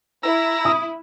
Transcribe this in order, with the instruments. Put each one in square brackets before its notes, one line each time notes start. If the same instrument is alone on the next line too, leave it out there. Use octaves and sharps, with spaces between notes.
[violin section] E4 [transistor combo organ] A#5 E6
[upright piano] D#6